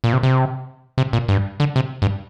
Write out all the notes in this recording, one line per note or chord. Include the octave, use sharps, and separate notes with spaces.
A#2
C3
C3
C3
A#2
G2
D3
C3
G2